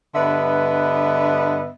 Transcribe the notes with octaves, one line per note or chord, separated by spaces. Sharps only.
G2 D3 B3 B4 D#5 E5